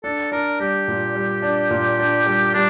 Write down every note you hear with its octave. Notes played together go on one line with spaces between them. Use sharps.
D4 A4
D4 A#4
G3 G4
A#2
G3
D4
A#2
D4
G3
G3 D4